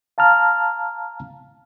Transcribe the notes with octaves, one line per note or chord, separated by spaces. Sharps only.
F5 A5 A#5 F6